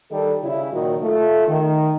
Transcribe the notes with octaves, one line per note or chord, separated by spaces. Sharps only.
D#3 G3 D#4 A4
C#3 E4
A#2 D#3 F#3 F#4 A#4 D#5
A3 F4
D#3